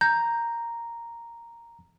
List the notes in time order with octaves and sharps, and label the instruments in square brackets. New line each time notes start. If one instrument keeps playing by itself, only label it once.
[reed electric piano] A#5 [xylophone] G6